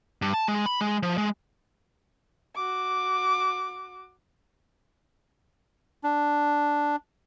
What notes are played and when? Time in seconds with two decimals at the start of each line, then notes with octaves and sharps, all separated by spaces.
0.22 G2
0.34 A5
0.48 G#3
0.66 B5
0.81 G#3
1.03 F3
1.18 G#3
2.55 F#4 D6
6.04 D4